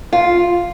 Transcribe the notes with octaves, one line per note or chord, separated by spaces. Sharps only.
F4